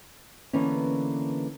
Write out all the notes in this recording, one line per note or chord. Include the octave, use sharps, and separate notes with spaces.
D3 E3 A#3 B3 C#4